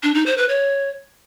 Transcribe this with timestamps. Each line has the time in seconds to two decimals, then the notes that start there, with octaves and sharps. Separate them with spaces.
0.03 D4
0.14 D#4
0.26 C5
0.37 B4
0.49 C#5